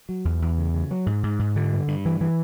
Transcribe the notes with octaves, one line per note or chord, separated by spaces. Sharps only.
F#3
E2
E2
C#3
C#3
F#3
G#2
G#2
G#2
D3
G2
G2
E3
E3